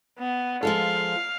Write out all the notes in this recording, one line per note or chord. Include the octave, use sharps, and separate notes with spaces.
B3
F3 G#3 A4 F5